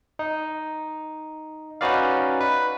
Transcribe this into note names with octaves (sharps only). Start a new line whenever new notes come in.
D#4
C#4 D#4 F#4 B4 D5 F5
B4